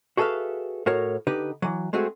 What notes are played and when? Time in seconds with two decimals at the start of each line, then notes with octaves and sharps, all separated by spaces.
0.17 F#4 G#4 A4 B4 E5 F5
0.86 A2 F#4 A#4 C#5
1.27 D3 D#4 G4 B4
1.62 E3 F#3
1.93 G#3 A3 C4 F#4 G#4